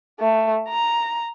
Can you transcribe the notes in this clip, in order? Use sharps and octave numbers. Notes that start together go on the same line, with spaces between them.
A3
A#5